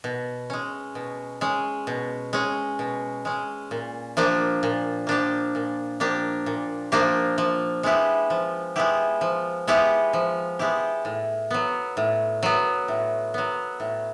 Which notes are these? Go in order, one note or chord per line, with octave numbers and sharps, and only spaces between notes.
B2
G#3 C#4
B2
G#3 C#4
B2
G#3 C#4
B2
G#3 C#4
A#2
F3 A#3 D4 G4
A#2
F3 A#3 D4 G4
A#2
F3 A#3 D4 G4
A#2
F3 A#3 D4 G4
F3
G#3 B3 E4 G4
F3
G#3 B3 E4 G4
F3
G#3 B3 E4 G4
F3
G#3 B3 E4 G4
A2
F#3 B3
A2
F#3 B3
A2
F#3 B3
A2